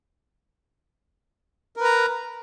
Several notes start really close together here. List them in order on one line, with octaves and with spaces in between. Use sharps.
A#4 B4 A#5